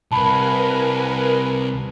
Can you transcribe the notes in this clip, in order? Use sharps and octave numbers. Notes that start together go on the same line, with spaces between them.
C2 A#4 B4 G#5 A5 B5